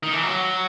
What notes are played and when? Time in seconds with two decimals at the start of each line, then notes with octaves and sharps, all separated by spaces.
0.03 D#3
0.13 E3
0.23 F#3